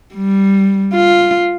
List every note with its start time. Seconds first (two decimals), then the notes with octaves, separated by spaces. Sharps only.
0.14 G3
0.94 F4